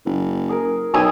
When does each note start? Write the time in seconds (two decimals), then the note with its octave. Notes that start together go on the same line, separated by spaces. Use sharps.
0.06 F#1
0.49 G#4 A#4
0.94 B1 G5 G#5 D#6 E6